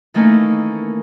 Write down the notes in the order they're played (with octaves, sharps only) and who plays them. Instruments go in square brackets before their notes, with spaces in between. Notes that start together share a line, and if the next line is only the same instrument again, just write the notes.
[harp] D#3 E3 A3 A#3 C#4 D#4